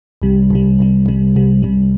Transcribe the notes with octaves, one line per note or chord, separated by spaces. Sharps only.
C2 C3 G3
C2 C3 G3
C2 C3 G3
C2 C3 G3
C2 C3 G3
C2 C3 G3